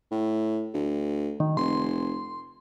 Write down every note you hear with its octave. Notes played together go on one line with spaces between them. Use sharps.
A2
D2
D#3
F1 C6